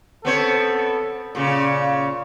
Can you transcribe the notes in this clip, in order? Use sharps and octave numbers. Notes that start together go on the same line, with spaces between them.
B3 C4 A4 C#5
A#2 C#3 C#5